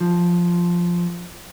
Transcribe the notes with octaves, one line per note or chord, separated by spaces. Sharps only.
F3